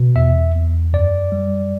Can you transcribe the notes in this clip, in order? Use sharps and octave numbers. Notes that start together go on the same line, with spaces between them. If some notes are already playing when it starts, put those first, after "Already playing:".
Already playing: B2
E2 E5
E2
F#2 D5
G3